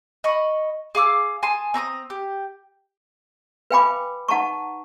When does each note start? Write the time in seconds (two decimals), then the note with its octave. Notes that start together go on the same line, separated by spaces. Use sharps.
0.24 D#5 B5 C#6
0.95 G#4 F5 D6 E6
1.43 G#5 A5 C6 D#6
1.74 C4 A#5 C#6 D#6
2.10 G4
3.71 B4 F5 G5 G#5 B5 D6
4.28 D#4 F#5 A5 A#5 C#6